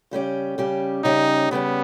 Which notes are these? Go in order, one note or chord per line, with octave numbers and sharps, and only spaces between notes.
C#3 G3 C#4 G4
C#3 G3 C#4 G4
C#3 G3 C#4 D#4 G4
C#3 G3 B3 C#4 G4